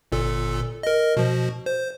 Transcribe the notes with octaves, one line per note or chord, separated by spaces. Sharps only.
G1 A#2 A4
A#4 D#5
B2 F3
C5